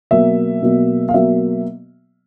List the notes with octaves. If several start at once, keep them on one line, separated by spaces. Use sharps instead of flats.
B2 F#3 A#3 E5
B2 F#3 A#3
F5
B2 F#3 A#3 E5